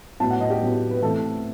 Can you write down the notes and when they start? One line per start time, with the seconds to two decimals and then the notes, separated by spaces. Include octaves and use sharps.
0.20 A2 F#3 B3 A5
0.31 F#5
0.40 D#5
0.50 G4
0.62 A2 F#3 B3
0.91 B4
1.02 E3 A3 C4 A4